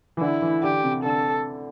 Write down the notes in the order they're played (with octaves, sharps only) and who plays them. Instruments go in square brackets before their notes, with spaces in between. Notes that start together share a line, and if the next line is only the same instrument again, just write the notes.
[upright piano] E3
[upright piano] D3 [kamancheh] E4
[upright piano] E3
[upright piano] D3 [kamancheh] G4
[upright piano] C3
[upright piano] D3 [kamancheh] A4